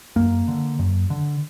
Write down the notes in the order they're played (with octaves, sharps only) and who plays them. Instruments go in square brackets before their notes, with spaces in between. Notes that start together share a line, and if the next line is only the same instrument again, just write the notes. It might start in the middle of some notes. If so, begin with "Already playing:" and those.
[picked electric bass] F#2 A#3
D3
F#2
D3